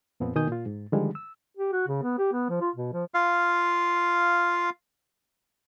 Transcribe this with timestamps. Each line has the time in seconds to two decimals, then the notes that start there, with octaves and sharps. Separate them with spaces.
0.20 F2 A#2 F3 B3 C4
0.35 B2 D#3 G#5 D#6 G6
0.48 A#2 F4
0.66 G#2
0.92 D3 D#3 F3 G3 G#3
1.15 E6
1.57 G4
1.72 F#4
1.88 C#3
2.02 B3
2.18 G4
2.32 B3
2.49 F3
2.61 F4
2.75 B2
2.93 F3
3.14 F4 F5